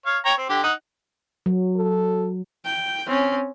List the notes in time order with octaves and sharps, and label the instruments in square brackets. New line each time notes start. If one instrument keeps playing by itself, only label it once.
[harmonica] C#5 F5
C#5 G5 A#5
C4
D3 G4
D#4 F#5
[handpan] F#3
[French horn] A4
[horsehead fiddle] G5
C4 C#4